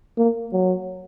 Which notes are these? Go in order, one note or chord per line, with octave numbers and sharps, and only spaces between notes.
A#3
F#3